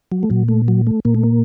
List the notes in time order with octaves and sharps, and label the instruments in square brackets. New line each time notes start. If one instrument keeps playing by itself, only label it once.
[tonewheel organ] F#3
A3
A#2 F#3
A3
F#3
A3
A#2 A#3
A3
A#3